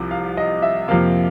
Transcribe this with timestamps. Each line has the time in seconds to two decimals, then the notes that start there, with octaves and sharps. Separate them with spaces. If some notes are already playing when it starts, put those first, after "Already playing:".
Already playing: C2 C3 F3
0.11 F5
0.37 D#5
0.62 E5
0.88 F2 C3 F3 A#3 F5